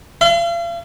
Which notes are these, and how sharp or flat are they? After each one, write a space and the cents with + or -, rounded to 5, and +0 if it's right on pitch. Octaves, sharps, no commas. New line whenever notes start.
F5 -40 C6 -40